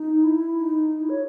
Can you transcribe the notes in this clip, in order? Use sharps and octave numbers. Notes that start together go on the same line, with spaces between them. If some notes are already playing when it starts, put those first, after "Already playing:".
Already playing: D#4
E4
D#4
E4
C#5